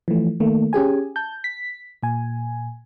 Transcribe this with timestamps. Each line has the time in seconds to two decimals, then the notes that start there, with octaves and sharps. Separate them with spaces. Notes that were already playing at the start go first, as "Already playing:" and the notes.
0.08 E3 F3 A3
0.40 D#3 A3 A#3
0.73 C#4 G4 G#4 G#5
1.16 A5 G6
1.44 B6
2.03 A#2 G#5